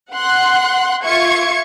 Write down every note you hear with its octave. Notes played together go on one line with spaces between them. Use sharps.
F#5 C6 F#6
F4 E5 C#6 G#6 C#7